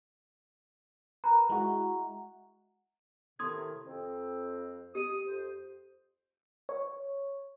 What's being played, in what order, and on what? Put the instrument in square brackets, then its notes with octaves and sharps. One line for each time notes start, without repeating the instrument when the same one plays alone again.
[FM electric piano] A#4 B4 [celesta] A#5
[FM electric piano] G#3 E4 F#4
[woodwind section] A2 C3 D#3 [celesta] C6 D#6 G#6
[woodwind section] F2 C4
[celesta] G4 D#7 [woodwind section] D#6
[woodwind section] F2 C5
[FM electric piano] C#5